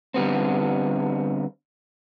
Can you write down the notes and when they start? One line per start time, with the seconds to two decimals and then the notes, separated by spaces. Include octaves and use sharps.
0.14 D3 G3 B3 C4